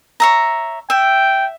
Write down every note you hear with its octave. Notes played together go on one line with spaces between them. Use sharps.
C#5 E5 A#5
E5 G5